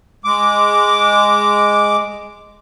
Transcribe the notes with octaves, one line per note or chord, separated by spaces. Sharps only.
G#3 D6